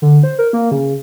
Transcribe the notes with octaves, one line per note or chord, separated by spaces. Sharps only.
D3
C5
A#4
A#3
C#3